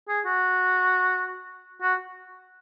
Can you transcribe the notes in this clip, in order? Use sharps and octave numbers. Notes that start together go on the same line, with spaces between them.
G#4
F#4
F#4